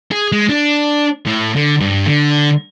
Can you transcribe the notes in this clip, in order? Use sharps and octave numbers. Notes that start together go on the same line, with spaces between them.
G#4
G#3
D4
A2
D3
G2
D3